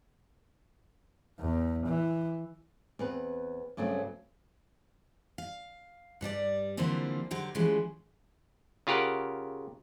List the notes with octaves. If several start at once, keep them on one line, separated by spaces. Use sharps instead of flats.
E2
E3
E2 C4 B4
G2 C#3 F#3 A3 C4
F5
G2 G3 A4 D5
D3 E3 F3 G3 A#3 C4
D3 F#3 G4 C5
E3 F3 G3 G#3 C#4
C#3 F4 G4 A#4 F#5